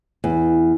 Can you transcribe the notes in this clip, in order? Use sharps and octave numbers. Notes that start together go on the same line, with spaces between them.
E2